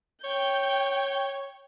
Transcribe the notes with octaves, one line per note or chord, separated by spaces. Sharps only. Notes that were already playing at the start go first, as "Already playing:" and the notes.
C#5 G5 G6